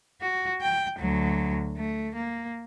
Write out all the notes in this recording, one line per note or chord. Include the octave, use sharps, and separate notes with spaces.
F#4
G5
D2 F#3
A3
A#3